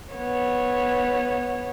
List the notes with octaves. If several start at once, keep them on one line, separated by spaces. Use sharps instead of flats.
B3 C#5